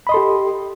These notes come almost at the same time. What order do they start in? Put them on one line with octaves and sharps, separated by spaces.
B5 D#5 C6 A4 G4